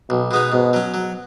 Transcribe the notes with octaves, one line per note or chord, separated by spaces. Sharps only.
B1 B2
B2 G#3 B3 D#4
G#2 B2
F#3 C#4
F#3